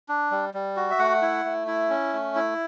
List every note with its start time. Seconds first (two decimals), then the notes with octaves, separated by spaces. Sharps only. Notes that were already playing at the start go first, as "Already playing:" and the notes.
0.08 D4
0.31 G3
0.54 G3
0.77 F#4
0.91 E5
0.99 A3 F#5
1.22 E4
1.45 A3
1.67 E4
1.90 C#4
2.13 A3
2.36 E4